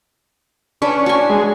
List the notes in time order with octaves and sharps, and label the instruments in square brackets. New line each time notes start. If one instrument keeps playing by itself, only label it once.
[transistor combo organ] C#4 [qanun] D4 B4
[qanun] F#4 G#5
[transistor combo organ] G#3